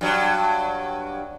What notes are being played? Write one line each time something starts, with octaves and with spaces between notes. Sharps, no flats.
G2 F#3